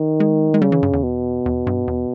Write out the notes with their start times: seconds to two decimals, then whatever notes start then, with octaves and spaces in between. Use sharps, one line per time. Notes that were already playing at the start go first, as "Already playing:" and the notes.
Already playing: D#3
0.20 G#3
0.54 G#3
0.61 C#3 G3
0.72 E3
0.83 G2
0.93 E2
1.03 B2
1.46 E2
1.67 G2
1.87 E2